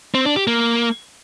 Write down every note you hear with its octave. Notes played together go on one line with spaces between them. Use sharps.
C4
D4
G4
A#3